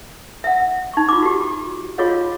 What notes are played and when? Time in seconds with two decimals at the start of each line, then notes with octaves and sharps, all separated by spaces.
0.44 E5 F#5
0.94 D#4 C#6
1.09 F4 D6
1.22 F#4 G4
1.98 F4 F#4 G#4 C#5 D#5 F5